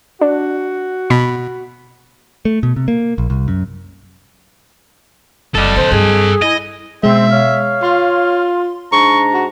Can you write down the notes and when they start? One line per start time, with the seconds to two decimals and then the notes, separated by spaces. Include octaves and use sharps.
0.21 D4 F#4
1.10 B2 B5
2.45 A3
2.63 B2
2.76 C3
2.88 A#3
3.18 A#1
3.30 C2
3.48 F#2
5.55 F#1 G3 A4 D#5
5.76 D3 C5
5.92 G2 G#4
6.42 E4 D#5 G#5
7.03 B2 G#3 C4 E5
7.32 C#5 F5
7.83 F4 C6
8.92 G#2 D4 A#5 C#6
9.33 F#4